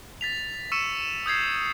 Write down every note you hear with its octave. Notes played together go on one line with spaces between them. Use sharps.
A6 B6 F7
C#6 E6 C#7 D#7 E7
D#6 G6 G#6 C7